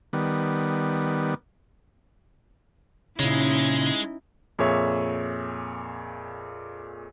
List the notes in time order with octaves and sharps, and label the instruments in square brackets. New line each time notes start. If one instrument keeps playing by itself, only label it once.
[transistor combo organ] D#3 G3 B3
[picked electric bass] A#2 C#3 [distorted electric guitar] G#3 [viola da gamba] C#4 D#4 E4
[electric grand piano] F2 A#2 G#4 C#5 E5